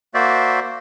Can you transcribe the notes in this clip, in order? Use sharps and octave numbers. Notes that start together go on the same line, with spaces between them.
A#3 F#4 C5 D5 E5